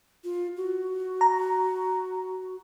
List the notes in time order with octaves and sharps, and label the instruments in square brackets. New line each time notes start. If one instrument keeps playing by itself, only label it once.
[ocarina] F4
F#4
[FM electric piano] A#5